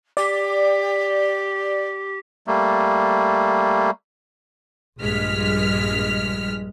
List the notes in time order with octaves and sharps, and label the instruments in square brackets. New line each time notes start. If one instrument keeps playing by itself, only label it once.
[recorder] G4 [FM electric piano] D5
[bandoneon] G3 A3 A#3
[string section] A#1 G2 G#3 F6 B6